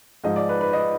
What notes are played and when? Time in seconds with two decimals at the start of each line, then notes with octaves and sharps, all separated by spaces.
0.24 G#2 F3 G#3 D#5
0.36 D5
0.49 B4
0.61 B4
0.73 D#5